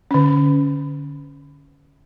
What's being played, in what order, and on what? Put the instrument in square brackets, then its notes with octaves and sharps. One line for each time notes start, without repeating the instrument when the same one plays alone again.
[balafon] D3 C#4